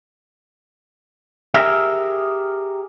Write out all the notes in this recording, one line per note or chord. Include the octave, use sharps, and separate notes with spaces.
G4 G#4 A#4 E5